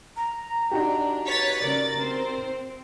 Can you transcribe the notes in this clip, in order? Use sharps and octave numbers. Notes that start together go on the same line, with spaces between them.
A#5
D4 D#4 F#4 G4
B4 C#5 A6 B6
C#3 A#4 D5 A6
C4 C5